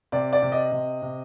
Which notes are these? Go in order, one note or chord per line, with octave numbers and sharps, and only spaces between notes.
C3 D5
D5
C3
D#5
C3
C3